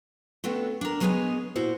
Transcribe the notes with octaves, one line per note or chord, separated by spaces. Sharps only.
A3 B3 C4 D4 F#4 A4
D4 A#4
F#3 G#3 B3 G#4 C#5 D#5
A#2 E4 F#4 C5